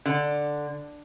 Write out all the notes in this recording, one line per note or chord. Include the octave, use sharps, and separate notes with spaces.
D3